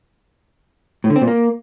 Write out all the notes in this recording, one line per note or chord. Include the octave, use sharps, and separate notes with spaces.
A2
D3
C4
A#2
A#3